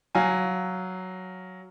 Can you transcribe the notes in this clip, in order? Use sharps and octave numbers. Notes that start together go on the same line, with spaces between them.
F#3 F5 G#5